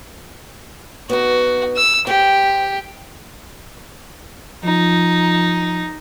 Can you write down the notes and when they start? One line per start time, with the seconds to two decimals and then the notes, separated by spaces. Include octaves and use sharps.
1.09 B3 D#4 F#4
1.76 E6
2.07 C4 G4
4.64 F3 D#4